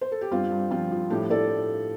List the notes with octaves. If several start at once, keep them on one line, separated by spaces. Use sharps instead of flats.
C5
A4
G4
G2 C4 F4
G2
F3 C4 F4
F3
A2 D4 G4
A2 A4 D5